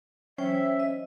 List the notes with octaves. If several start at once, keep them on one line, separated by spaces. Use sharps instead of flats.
E3 F#3 C#4 C5 C#5 E5 G5
C5 D#5